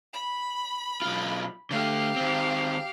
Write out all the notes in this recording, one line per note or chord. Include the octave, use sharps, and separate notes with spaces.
B5
B1 F4
D3 A3 G4 F5
D#3 C4